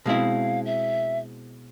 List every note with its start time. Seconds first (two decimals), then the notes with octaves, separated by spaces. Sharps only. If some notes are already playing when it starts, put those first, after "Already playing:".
0.06 B2 G#3 C4 E4 F5
0.65 E5